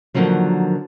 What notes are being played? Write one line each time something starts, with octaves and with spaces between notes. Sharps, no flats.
A#2 D3 D#3 F3 F#3